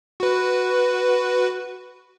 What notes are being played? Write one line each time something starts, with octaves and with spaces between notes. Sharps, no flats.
F#4 B4